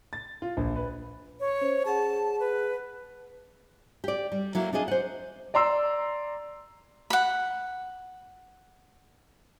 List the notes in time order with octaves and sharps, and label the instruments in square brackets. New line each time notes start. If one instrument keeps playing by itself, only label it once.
[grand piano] A6
F4
A#1
B4
[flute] C#5
[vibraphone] C#4 C5
[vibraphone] G#4 F#5 [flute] A5
[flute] B4
[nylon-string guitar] G4 D5
G3
F#3 A#3 E4
D4 F4 G#4 D#5
C5 F#5
[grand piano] D5 A#5 C6 E6
[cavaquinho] F#5 B5